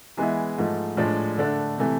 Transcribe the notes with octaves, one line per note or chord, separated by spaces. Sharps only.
E3 G#3 B3 E4
G#2 F3 A3
A2 F3 G#3 D4
D3 A3 D4
C3 E3 A3